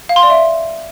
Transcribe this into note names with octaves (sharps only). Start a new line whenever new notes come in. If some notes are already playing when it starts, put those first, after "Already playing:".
F5
C6
D5
E5